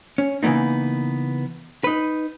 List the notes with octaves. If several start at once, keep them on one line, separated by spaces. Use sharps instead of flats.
C#4
C#3 E3 A#3 B3 D#4
D#4 B4